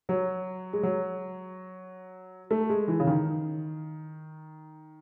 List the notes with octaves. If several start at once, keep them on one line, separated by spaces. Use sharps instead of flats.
F#3
G#3
F#3
A3
G#3
E3
C#3
D#3